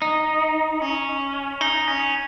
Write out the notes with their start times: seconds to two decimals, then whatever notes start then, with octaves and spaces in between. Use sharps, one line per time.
0.02 D#4
0.82 C#4
1.61 D#4
1.88 C#4